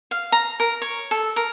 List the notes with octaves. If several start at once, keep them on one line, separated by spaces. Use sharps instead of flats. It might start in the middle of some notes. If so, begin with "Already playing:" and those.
F5
A#5
A#4
C#5
A4
A#4